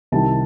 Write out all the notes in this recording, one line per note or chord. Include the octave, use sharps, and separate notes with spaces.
C2 C3 D#3 A5